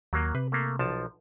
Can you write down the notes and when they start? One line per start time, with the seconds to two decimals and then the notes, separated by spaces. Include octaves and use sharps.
0.13 D#2 F#3 A#3
0.35 C3 B4
0.52 A3 A#3
0.79 B1 F3 A5